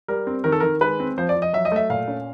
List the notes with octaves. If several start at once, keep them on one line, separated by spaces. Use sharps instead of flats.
G3 A#4
C4
D#3 A#4
A4
D#3 A#4
G#3 B4
C4
F3 C5
D5
F3
D#5
F#3 E5
D#5
A3 E5
A#2 F5
C#4